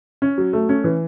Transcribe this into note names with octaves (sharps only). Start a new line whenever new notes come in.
C#4
F#3
A3
C#4
E3